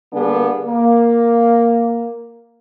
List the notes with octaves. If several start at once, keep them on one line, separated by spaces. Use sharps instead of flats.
D3 G3 A#3 B3 D4 G#4
A#3